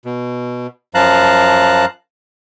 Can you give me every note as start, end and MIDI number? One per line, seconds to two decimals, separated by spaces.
0.05 0.67 47
0.95 1.85 42
0.95 1.85 53
0.95 1.85 77
0.95 1.85 81
0.95 1.85 82
0.95 1.85 90